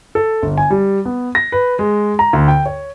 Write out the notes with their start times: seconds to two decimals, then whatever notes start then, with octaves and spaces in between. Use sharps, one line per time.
0.15 A4
0.42 G1
0.58 G#5
0.70 G3
1.05 B3
1.35 A#6
1.52 B4
1.79 G#3
2.19 A#5
2.33 D2
2.48 G5
2.66 C#5